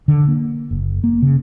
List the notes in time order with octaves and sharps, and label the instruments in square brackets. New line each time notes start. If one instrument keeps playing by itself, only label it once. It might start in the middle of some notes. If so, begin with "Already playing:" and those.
[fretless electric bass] D3
A#3
F#1
A#3
C#3